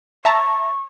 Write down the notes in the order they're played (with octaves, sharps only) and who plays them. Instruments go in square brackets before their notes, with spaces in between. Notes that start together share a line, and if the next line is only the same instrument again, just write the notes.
[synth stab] E5 A5 A#5 [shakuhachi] C#6